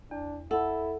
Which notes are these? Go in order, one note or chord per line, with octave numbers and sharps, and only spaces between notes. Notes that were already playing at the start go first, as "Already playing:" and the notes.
E2 D4
E4 A4 F#5 E6